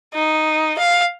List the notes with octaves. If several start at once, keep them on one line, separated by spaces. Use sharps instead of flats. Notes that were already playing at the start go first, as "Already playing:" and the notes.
D#4
F5